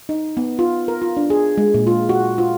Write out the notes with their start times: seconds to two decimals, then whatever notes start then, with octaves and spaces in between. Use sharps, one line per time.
0.09 D#4
0.37 B3
0.59 F4
0.88 A#4
1.02 F4
1.17 D4
1.30 G#4
1.58 G#3
1.74 A#2
1.87 F4
2.09 F#4
2.38 F4